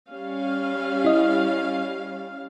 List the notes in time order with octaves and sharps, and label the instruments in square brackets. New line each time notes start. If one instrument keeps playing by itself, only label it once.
[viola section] G3 C#4 F5
[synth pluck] E4 D#5